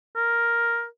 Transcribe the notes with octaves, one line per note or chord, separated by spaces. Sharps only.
A#4